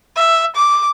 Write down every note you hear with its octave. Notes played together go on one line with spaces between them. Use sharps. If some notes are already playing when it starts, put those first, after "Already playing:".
E5
D6